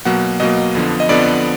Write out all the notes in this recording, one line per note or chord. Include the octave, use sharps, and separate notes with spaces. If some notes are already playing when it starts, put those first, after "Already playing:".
B2 F#3 A#3 F#5
B2 F#3 A#3 D#5
F2 D3 F3 B3
D#5
F2 D3 F3 B3 D5